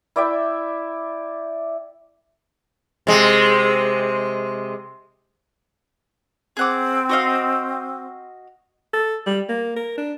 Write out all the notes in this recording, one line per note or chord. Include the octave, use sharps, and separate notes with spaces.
E4 D5 E5 G5
C3 G#3
C4 G#4 F#5 D6
F#4 D#5 F5
A4
G3
A#3
A#4
D4